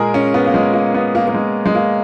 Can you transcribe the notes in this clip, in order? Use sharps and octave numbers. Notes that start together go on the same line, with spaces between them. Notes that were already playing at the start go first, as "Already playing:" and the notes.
Already playing: A#2 G#3 G#4 A#4
C#4
B3
A#3
G#3
A#3
B3
A#3
A#3
G#3
G#3
A#3